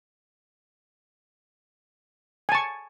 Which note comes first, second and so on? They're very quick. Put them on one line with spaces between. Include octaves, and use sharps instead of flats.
G#5 A5 C#6